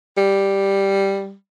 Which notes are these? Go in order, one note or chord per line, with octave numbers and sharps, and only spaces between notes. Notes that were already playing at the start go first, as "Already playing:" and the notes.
G3